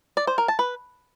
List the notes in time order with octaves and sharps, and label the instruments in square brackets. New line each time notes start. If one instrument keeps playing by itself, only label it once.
[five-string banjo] D5
C5
A#4
A5
B4